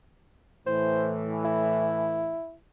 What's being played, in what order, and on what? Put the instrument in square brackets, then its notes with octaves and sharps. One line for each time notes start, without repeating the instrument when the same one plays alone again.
[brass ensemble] A2 E3 [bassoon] C5
[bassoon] E4